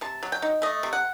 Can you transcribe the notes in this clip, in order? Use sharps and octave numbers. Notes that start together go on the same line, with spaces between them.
C3 A5
F#3
G5
D#4
A3 D#5
C3
F#5